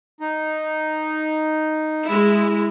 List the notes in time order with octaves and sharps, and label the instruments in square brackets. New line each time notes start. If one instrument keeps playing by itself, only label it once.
[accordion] D#4
[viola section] G#3 E4